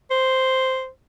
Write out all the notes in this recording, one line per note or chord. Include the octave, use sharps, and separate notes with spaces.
C5